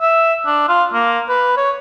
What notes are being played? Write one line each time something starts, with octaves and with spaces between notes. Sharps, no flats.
E5
D4
F4
A#3
B4
C#5